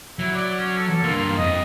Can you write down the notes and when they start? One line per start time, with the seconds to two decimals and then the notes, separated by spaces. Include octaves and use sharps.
0.19 F#3 E4
0.34 D5
0.59 C#4
0.78 A4
1.04 G2 A#3 F4
1.38 F2 D#5